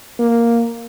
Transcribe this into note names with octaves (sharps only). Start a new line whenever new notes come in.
A#3